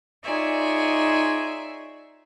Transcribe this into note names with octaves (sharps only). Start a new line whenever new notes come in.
D#4 F4 G#4 C#5 D5 E5